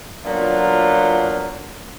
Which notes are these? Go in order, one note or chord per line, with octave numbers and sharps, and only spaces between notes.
A#2 F#3 B3 D4 F4